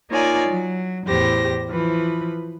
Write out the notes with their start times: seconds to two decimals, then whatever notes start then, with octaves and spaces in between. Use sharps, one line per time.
0.11 A#3 D#4 F4 C#5 D5 G#5
0.49 F#3
1.07 E2 A2 G4 C5 A#6
1.70 E3 F3 B4